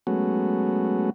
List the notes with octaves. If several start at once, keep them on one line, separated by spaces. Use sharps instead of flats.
F#3 G#3 A3 B3 C#4 F#4